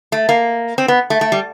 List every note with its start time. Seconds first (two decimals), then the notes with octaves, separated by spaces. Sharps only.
0.12 A3
0.29 A#3
0.78 C4
0.88 B3
1.10 A3
1.21 A3
1.32 G3